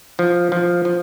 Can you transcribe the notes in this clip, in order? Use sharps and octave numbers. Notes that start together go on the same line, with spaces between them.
F3
F3
F3